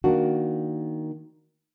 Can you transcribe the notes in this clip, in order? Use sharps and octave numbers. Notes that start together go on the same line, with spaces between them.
D#3 A#3 D4 F#4